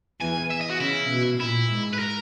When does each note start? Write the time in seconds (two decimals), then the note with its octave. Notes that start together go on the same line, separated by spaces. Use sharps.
0.20 E2 E3 G#5
0.51 E5
0.61 D#5
0.70 F#4
0.80 C#3 E4
1.10 B2
1.40 A#2 E4
1.70 G#2
1.93 B4
1.99 A#4